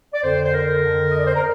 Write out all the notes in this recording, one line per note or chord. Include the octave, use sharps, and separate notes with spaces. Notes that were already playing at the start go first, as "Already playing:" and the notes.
D5
F2 D3 C5
C5
A#4
F2 D3
D#5
D5
C5
A#4